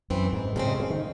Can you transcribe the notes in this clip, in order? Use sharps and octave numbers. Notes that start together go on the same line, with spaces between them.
F#2 E3 C4 F#4
G#2
A2 C#3 G#3 C4
C3
C#3
D#3